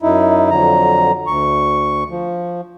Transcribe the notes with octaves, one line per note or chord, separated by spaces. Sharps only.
F#2 D#4 E4
F2 D3 F#3 A#5
D2 C#6
F3